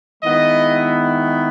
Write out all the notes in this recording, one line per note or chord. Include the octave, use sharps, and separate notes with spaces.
D#3 G#3 B3 E4 D#5